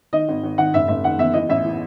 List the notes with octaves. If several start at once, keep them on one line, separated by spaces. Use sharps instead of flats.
D#3 D#5
G#1
G#1
D#3 F#5
F#1 E5
F#1 E5
D#3 F#5
E2 E5
E3 D#5
A1 E5
E3